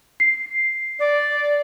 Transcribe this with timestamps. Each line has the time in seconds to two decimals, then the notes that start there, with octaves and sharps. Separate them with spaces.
0.20 C7
1.00 D5